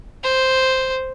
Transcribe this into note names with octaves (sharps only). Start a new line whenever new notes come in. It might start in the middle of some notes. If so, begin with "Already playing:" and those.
C5